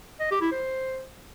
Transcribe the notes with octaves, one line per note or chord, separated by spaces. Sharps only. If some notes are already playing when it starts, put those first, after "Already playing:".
D#5
G4
E4
C5